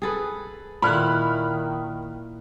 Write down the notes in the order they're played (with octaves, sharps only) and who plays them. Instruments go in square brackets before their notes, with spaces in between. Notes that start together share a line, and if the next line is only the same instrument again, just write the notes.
[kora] G#4 A4 B4
[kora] A#2 E4 [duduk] D#3 [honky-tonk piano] B5 F6 F#6